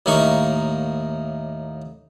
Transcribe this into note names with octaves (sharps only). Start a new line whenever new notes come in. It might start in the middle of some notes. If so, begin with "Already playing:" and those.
D#2 A2 A#3 D#4 C#6